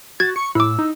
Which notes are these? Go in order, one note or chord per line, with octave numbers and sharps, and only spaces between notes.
F#4 G#6 A6
C#6 C#7
A2 E4 D6 E6
D#4